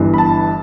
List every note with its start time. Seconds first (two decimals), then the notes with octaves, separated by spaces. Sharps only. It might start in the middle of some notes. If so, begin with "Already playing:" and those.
Already playing: G1 G2 E3
0.14 B5
0.18 A5